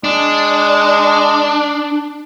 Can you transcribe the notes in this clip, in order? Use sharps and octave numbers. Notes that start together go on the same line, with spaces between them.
G#3 D4